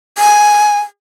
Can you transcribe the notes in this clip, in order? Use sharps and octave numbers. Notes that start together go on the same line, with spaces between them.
G#5